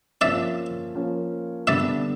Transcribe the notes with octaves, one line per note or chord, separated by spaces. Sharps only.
F3 A#3 C#4 D5 E5
F3 A#3 C#4
D3 G3 B3 D4 D5 E5